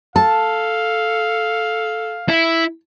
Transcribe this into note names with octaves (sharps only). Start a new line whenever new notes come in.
A4 F5 A5
E4